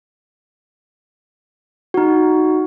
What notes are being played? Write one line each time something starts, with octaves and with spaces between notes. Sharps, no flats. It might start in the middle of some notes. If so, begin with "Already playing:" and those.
D#4 F#4